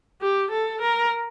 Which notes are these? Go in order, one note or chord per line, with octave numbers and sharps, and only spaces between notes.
G4
A4
A#4